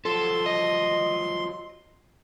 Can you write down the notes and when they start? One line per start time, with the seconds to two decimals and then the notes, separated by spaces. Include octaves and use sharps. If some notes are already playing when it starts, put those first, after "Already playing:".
0.05 F3 F#3 A4 C6
0.46 D#5